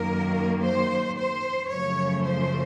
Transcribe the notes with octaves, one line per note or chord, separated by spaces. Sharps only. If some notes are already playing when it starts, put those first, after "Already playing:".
Already playing: F#2 D#3 A#3 A#4
C5
C5
F#2 C#3 F3 A3 C#5
C5